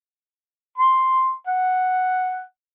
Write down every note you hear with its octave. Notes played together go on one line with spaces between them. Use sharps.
C6
F#5